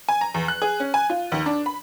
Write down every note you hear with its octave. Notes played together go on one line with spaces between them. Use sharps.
G#5
A#5
E2
F#6
G#4
C#4
G#5
F4
D#2
D4
B5